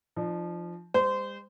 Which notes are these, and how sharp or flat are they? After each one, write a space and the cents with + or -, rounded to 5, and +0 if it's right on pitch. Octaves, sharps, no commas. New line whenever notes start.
F3 -10 D4 +45
G3 +45 C5 -20